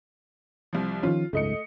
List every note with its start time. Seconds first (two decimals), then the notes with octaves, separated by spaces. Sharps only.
0.73 C2 F3
1.03 D#3 F3 C#4 F4
1.33 F#1 C#2 G#2 A3 D#5 C#7